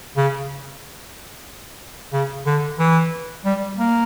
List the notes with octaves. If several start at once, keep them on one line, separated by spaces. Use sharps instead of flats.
C#3
C#3
D3
E3
G3
A#3